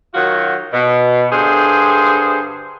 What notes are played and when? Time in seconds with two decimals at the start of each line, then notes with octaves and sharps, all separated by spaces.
0.15 D#3 F#3 F4 F#4
0.73 B2
1.32 G2 D3 G#4 C5